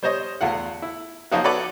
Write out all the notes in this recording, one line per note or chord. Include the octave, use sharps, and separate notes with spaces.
G3 C5 C#5 D#5
E2 A3 F4 F#5
E4
F3 F#3 A#3 D#4 F4 F#4
F#4 A4 B4 C#5 D5